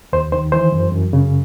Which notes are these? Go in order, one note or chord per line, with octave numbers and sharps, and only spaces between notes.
D#2 C5
D#3 C5
E3 C5
F#2
F#2
C#3